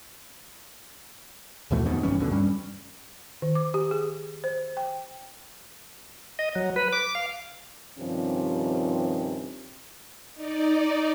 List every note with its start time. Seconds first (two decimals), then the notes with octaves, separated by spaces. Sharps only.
1.71 D#2 B2 E3 A3
1.85 F2 G#2 B2 D#3
2.03 G#1 G2 E3 C#4
2.19 D#2 B2 D3
2.31 G2 G3 C#4
3.42 D#3
3.55 D6
3.74 G4
3.91 G#4
4.44 C5
4.77 G5
6.39 D#5
6.55 F#3
6.76 B4
6.93 D6
7.15 F5
7.98 G2 C3 D#3 F3 C4 C#4
10.34 D#4 D5